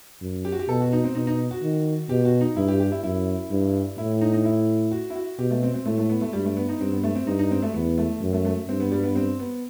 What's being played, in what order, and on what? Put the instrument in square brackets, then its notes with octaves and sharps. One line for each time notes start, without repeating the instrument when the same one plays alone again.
[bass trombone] F#2
[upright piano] G4
F#4
G4
[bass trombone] B2 [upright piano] A4
[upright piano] F#4
D#4
C4
[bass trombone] B2 [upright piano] D#4
[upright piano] D#4
F#4
[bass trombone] D#3
[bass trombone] B2 [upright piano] G4
[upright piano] F#4
D#4
[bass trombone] G2 [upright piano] E4
[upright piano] G4
G4
E4
[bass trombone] F#2 [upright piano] E4
[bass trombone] G2
[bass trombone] A2 [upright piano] E4
[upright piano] D#4
D#4
E4
F#4
E4
F#4
[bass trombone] B2 [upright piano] G4
[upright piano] A3
C4
C4
[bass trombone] A2 [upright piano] A3
[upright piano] A3
B3
A3
[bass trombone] G2 [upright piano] G3
[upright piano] A3
B3
D#4
[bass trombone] G2 [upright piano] C4
[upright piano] B3
A3
C4
[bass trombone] G2 [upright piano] D#4
[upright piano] D#4
C4
A3
[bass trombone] E2 [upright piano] B3
[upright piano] A3
[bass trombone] F#2
[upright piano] A3
A3
[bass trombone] G2 [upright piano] C4
[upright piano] B3
G3
B3
C4
B3